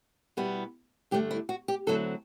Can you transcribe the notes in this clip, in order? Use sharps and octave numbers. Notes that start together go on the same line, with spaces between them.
B2 G3 B3 E4
G2 D3 A3 G4
E4
F#4
G4
D2 D3 F#3 C4 E4 A4